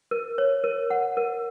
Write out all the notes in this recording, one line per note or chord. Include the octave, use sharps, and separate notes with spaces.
A#4
C#5
A#4
F#5
A#4